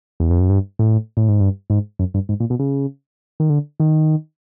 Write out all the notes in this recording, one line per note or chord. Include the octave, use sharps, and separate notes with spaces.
E2
F2
F#2
G2
A2
A2
G#2
G2
G#2
F#2
G2
G#2
A#2
B2
C#3
D#3
D3
D#3